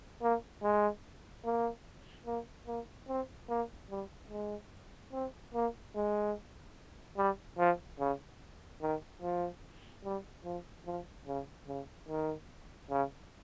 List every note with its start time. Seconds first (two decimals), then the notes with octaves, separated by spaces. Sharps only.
0.22 A#3
0.63 G#3
1.45 A#3
2.27 A#3
2.67 A#3
3.08 C4
3.49 A#3
3.91 G3
4.31 G#3
5.13 C4
5.54 A#3
5.96 G#3
7.18 G3
7.58 F3
8.00 C#3
8.82 D#3
9.22 F3
10.05 G3
10.45 F3
10.86 F3
11.27 C#3
11.68 C#3
12.09 D#3
12.90 C#3